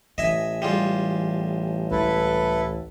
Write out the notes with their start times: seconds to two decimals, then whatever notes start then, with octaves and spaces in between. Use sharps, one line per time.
0.18 A1 E3 D#5 E5 G#5
0.62 G3 G#3 F4
1.91 C#2 E4 A4 B4